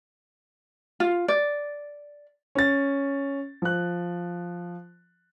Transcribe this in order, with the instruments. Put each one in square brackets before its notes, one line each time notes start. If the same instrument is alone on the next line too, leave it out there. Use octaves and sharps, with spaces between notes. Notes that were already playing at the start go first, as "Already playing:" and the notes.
[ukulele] F4
D5
[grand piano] C#4 A6
F3 F#6